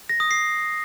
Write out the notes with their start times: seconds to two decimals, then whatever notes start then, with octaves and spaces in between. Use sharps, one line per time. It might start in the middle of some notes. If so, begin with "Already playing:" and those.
0.09 A#6
0.20 D#6
0.31 C7